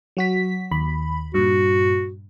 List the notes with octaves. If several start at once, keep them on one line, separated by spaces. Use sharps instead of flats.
F#3 F#4 B6
D#2 B5
G2 A#2 F#4